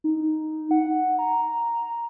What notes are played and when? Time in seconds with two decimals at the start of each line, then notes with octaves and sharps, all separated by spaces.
0.04 D#4
0.71 F#5
1.19 A#5